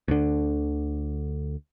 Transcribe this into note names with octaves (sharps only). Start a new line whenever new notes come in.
D2 D3